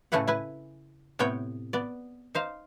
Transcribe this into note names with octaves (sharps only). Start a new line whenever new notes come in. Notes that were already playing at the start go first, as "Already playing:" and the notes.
A2 C#3 A3 E4 B4 F#5
E4 B4 G#5
A2 C3 B3 C#5 G5
B3 D5
D#4 C5 F5